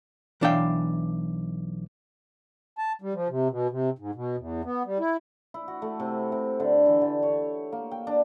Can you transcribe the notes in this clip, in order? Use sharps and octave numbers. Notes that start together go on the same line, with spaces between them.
B1 E3 D4 E5 F5 G5
A5
G3
F3
C3
B2
C3
G#2
B2
E2
B3
G3
E4
E4
F#4
A3
C3
C3
D3
E3
D3
C#5
A#3
G5
D4